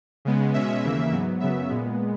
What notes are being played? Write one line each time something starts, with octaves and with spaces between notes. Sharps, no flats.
C#3 G#3 B3
B2 G#3 C#4 E5
D#2 C#3 E3 A#3
G#2 F#3 B3
F#2 C#3 F#3 B3 E5
A#2 G#3 B3